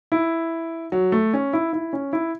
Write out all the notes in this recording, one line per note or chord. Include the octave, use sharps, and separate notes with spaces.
E4
F#3
A3
C#4
E4
E4
C#4
E4